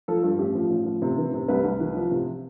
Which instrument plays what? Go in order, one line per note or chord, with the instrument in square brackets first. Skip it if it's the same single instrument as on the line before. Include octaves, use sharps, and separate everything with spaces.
[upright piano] F3 A4
G2 A4
A1 G4
F3
A1
F3
C3
E3
C3
C2 B4
C2
E3
F3
C3